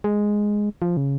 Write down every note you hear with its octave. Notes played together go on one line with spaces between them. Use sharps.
G#3
F3
C#3